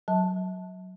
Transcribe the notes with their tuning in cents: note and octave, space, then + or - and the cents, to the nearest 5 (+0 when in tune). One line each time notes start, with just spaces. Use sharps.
F#3 +0 E5 -40 A5 +0